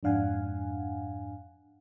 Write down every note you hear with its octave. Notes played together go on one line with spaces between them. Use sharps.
F2 G#2 D4 F5 F#5 G#5